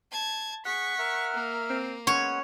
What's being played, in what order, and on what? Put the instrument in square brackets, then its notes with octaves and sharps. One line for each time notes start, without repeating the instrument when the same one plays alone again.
[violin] A5 G#6
[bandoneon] G#4 [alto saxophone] F#5 [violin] C#6 B6
[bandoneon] A#4 E5 F6
[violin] A#3
[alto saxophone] C4
[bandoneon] G#3 B3 F#5 [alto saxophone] C#4 [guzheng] C#5